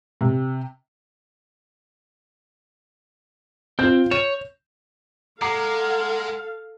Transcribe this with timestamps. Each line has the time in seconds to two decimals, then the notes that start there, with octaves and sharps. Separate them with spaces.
0.21 C3
3.79 C4 F4 G6
4.11 C#5 E7
5.42 G#3 A4 F5 F#5 A#5 D6 C7